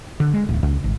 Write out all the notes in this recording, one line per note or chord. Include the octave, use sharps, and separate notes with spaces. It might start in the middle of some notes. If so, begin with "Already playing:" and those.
D3
G#3
D1
C#2
G#1